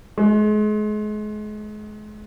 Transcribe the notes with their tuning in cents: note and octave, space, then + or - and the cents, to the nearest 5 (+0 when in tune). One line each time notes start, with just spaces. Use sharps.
G#3 +35